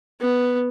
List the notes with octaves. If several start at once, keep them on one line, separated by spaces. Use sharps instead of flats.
B3